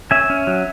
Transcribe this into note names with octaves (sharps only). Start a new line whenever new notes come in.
C#4 E5 G#5
C#4
F#3